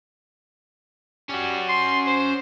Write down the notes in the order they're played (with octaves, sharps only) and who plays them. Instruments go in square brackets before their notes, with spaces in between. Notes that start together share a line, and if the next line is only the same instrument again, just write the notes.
[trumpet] G3 [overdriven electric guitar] C#4 F#4
[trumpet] C6
C5